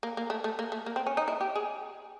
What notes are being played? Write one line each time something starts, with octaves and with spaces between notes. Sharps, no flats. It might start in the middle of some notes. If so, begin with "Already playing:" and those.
A#3
A#3
A3
A3
A#3
A3
A#3
C4
C#4
D#4
E4
G4
G#4